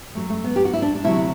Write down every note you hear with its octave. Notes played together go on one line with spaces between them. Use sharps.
F#2 F#3 A3
A3
B3
G4
F#4
E4
D4
D4
D2 C3 F#3 E4